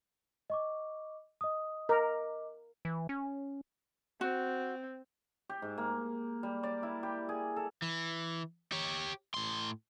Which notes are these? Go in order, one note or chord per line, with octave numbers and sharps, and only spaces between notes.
D#5 C#6 D6
D#5 D#6
A#4 D#5 D6
E3
C#4
C4 F#4
G4
G#2
A#3
G3
D5
E4
G4
G#4
A4
E3
G4 C#5
A2 C6